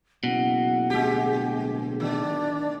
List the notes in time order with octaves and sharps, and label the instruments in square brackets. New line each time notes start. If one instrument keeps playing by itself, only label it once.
[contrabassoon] F#1 [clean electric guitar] B2 [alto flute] F#5
[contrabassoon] D1 [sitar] G#3 G4
[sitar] D#3 [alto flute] D4